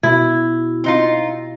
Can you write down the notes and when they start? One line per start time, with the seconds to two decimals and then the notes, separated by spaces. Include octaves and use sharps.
0.03 B2 E4
0.84 C4 D#4 F4